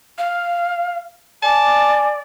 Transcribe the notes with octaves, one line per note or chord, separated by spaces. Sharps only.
F5
D5 G#5 A5